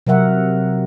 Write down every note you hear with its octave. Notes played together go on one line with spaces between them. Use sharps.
C3 F#3 A#4 E5 F#5